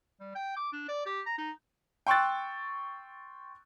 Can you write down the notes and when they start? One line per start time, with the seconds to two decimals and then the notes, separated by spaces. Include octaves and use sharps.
0.20 G3
0.35 G5
0.56 D6
0.73 D4
0.88 D5
1.06 G4
1.26 A#5
1.38 D#4
2.07 G5 C6 C#6 E6 F#6 A6